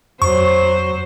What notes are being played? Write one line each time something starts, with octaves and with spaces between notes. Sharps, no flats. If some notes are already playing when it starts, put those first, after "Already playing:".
F2 F#3 C5 C#6